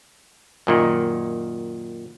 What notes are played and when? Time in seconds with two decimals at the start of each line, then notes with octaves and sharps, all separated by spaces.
0.67 F#2 A#2 D#3